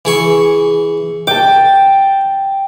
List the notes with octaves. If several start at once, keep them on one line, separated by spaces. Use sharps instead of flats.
E3 G#4 C#6
G5 A5 D6